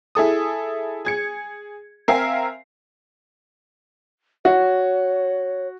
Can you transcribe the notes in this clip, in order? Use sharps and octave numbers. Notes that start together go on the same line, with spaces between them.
E4 G#4 A4 D#6
G#4 G#6 C#7
C4 A#4 E5 F5 G#5 C7
F#4 C#5